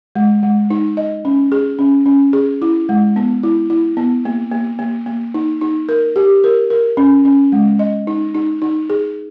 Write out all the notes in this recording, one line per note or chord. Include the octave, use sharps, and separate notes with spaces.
G#3
G#3
D#4
D#5
C#4
G#4
C#4
C#4
G#4
E4
G#3
B3
E4
E4
B3
A#3
A#3
A#3
A#3
D#4
D#4
A#4
G4
A#4
A#4
C#4
C#4
G#3
D#5
D#4
D#4
D#4
G#4